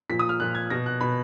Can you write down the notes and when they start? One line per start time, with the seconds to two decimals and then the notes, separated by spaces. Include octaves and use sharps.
0.09 A#2 F3 B6
0.19 D#6
0.29 F6
0.40 A#2 F3 F#6
0.55 G#6
0.70 B2 A#6
0.86 F#6
1.01 B2 B5